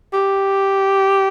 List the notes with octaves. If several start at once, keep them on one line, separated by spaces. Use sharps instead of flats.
G4